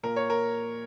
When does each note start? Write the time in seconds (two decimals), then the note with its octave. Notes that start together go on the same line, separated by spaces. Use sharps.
0.03 A#2 A#4
0.16 C#5
0.30 A#4